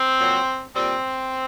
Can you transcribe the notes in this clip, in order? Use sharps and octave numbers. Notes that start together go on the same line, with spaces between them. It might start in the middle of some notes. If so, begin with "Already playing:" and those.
Already playing: C4
A#2 F#3
A#2 G3 C4